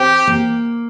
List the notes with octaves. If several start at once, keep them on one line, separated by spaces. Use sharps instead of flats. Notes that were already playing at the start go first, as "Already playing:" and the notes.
Already playing: C4 G4
A#3